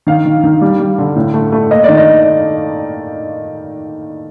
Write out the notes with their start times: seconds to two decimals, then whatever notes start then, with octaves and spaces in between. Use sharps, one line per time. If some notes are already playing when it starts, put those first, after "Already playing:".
0.07 D#3 F5
0.26 D#3
0.44 D#3
0.61 G3
0.80 G3
0.98 D3
1.16 A2
1.34 A3
1.52 A3
1.70 A#3 D#5
1.84 D#3 D5
1.97 D#5